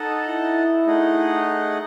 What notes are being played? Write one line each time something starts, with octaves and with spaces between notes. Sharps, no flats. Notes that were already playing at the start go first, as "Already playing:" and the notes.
Already playing: D#4 A4 D#5 F#5 A5
E4
A3 D#4 G#4 D#5 F#5